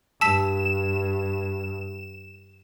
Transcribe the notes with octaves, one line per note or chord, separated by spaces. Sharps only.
G2 A5 E6 B6 E7